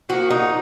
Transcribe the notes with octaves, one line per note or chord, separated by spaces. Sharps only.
F3 A#3 F#4
D#4